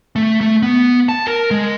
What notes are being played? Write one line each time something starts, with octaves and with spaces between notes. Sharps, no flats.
A3
A3
B3
A5
A#4
G#3